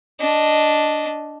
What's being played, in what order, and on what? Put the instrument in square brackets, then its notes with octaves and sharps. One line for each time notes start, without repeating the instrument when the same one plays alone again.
[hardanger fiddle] D4 D#5